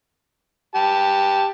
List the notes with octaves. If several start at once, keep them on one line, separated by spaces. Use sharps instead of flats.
G4 A5